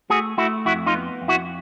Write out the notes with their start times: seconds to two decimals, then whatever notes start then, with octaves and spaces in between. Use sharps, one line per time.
0.10 A3 F#4 G#4
0.38 A3 E4 F#4
0.65 F2 E4 F#4
0.86 D#4 F4
0.94 B3
1.21 F2
1.28 E4 F#4